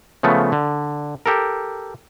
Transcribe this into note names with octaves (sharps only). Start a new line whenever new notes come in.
C#3 F3 A3 B3
D3
G4 A4 A#4